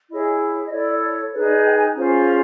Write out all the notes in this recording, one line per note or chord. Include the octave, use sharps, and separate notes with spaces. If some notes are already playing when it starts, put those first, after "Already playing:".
E4 G#4 C#5 D#5
D#5
E4 A4 C#5 D5
D#4 G#4 B4 C#5
D5
D#5
G5
G#5
C#4 F4 G#4 C5